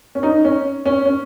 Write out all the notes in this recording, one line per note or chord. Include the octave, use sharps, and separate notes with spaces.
C#4
D#4
C#4
C#4
C#4